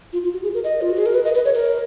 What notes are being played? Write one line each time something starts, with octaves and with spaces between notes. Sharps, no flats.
F4
F4
F#4
G#4
A#4
D#5
F4
F#4
G#4
A#4
B4
D#5
B4
C#5
A#4